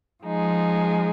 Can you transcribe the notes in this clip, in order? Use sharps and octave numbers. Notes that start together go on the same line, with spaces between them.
F3 G#3 D#4 G#4